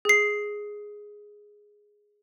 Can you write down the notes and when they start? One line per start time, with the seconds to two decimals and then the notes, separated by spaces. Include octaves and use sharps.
0.05 G#4 C7